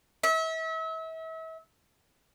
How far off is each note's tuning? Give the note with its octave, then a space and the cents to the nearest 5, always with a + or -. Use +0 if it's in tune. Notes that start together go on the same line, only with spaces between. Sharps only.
E5 -35